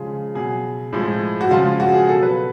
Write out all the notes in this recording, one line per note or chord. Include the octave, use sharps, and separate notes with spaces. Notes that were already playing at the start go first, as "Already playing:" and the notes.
Already playing: C#3 F3 G#3 G#4
B2 F#3 G#4
A2 F3 G#3
F#4
C#3 F3 G#3 F4
F4
F#4
G#4
B2 F#3 A4
B4